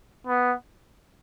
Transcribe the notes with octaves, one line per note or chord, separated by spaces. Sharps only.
B3